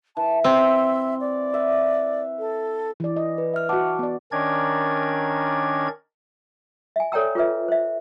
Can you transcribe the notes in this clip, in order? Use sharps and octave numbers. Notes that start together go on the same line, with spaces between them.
E3 A5
C4 E5
D5
E5 F#5
A4
E3 D5
D#5
B4
E5 F6
F#4 F#5 A5 D6
B3 D5
D#3 C#4 D4 A#4 D5 G#6
E5 G#5
A4 C#5 D5 G5 A#5 E6
F4 G#4 B4 E5
C5 E5